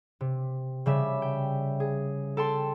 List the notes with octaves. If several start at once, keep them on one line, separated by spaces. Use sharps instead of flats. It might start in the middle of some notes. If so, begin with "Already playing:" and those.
C3
C#3 G3 E5
G5
G#4
A4 G5 A5 C6